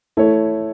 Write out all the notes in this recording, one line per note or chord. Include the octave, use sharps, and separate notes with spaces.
A3 E4 A4 C#5